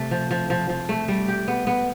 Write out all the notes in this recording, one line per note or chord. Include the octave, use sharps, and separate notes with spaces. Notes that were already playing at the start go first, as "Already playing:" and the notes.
Already playing: C3 A3
F3
F3
F3
F3
A3
G3
G4
B3
B3